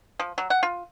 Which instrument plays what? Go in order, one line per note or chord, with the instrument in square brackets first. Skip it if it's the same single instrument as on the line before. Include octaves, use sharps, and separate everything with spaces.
[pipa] F3
F#3
F#5
F4